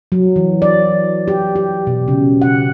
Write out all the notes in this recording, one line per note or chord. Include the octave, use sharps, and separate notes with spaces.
F#3
E3
D5
G4
G4
B2
C#3
F#5